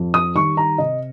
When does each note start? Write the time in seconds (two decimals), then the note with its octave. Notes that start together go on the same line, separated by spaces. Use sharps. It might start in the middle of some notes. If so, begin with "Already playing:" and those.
Already playing: F2
0.14 D#6
0.35 D#3 G3 C#6
0.57 A#5
0.78 C3 D#5